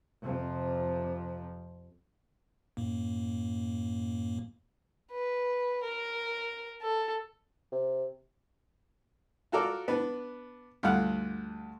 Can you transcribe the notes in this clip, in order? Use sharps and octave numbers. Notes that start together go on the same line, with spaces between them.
F2 C3 F3
F#2 A2 A#3
B4
A#4
A4
C3
F4 F#4 A4 A#4 D5
B3 D4 B4
D2 G2 F4 F5 F#5